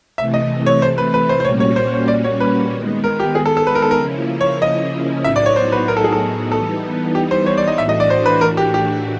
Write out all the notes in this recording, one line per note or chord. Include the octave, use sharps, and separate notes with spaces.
C3 E3 A3 E5
D#5
C#5
C5
B4
B4
C5
C5
A#2 G3 A#3 C#4 F#4 C#5
C#5
C5
C#5
D5
C#5
B4
D#3 G#3 B3
A#4
G4
G#4
A4
A4
B4
A#4
A4
A#4
C#3 F3 A#3 C#4 E4
C#5
D#5
A2 F#3 B3 D#4 F#4 E5
D5
C#5
C5
B4
A#4
A4
G#4
A4
E3 G3 B3 D#4 A4
G4
C5
C#5
D5
D#5
A2 E3 A3 D4 F#4 E5
D#5
D5
C5
B4
A#4
G4
G4